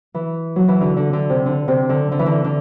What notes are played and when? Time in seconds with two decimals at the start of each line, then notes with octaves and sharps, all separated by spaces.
0.14 E3
0.56 F#3
0.68 E3
0.80 D3
0.97 D3
1.13 D3
1.30 C3
1.46 D3
1.68 C3
1.89 D3
2.12 D3
2.19 E3
2.26 D3
2.44 D3